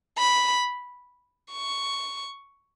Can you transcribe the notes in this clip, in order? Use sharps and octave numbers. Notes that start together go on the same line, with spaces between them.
B5
C#6